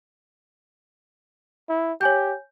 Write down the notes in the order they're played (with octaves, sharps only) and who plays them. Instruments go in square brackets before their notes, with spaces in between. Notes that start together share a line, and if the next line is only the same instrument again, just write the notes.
[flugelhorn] E4
[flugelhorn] G4 [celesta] C#5 G#5 G6